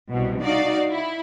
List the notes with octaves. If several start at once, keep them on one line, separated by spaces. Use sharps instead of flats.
C2 B2
D#4 F#4 D5 F5
E4